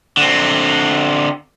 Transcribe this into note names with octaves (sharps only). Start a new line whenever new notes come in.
D3 C4